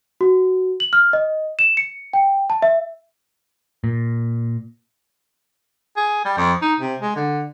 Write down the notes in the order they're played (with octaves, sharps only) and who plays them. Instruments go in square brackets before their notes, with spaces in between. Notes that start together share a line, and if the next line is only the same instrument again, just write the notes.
[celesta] F#4
F#7
F6
D#5
E7
C#7
G5
A5
E5
[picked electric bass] A#2
[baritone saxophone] G#4
G3
F2
D#4
C3
G#3
D3